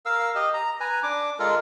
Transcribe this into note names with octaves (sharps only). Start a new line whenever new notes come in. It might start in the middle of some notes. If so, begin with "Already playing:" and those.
A#4 F5 E6
G4 D#5
A#5
B4 G#5 A#5
D4 D6
G#3 F4 A4 A#4